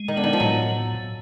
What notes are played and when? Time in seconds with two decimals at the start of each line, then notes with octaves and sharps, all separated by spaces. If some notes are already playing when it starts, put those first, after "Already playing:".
Already playing: G#3
0.08 D#3
0.16 D3 B3
0.24 D#3
0.33 F3
0.40 A2 F#3